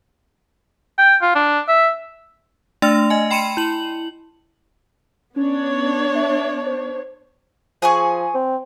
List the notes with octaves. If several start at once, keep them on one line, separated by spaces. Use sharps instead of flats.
G5
F4
D4
E5
A3 D4 E6 A6 F7
D#5 G#5
G5 B5 C6 C#7 D#7 E7
E4 F#7
B3 C#4 D4 C#5
E5
C5
F3 G#4 G#5 C#6
C4